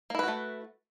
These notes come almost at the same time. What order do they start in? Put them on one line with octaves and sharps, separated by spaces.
A#3 E4 B4 F#4 A3